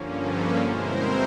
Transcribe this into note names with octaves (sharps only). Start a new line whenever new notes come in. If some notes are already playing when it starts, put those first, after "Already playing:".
Already playing: G2 D3 F3 A#3 C#4
A4 B4
B2 G#3 C4 E4 A#4 C5